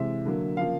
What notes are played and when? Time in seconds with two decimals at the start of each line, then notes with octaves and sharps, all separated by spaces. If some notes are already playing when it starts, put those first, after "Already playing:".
Already playing: C3 E3 G#3 E5
0.25 D3 F#3 A#3
0.57 C#3 F3 A#3 F5